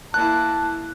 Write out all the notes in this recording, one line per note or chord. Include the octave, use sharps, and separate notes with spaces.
A#3 E4 A5 F#6